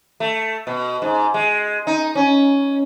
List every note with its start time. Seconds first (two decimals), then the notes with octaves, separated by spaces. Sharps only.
0.20 A3
0.67 B2
1.02 G#2
1.34 G#3
1.87 D#4
2.15 C#4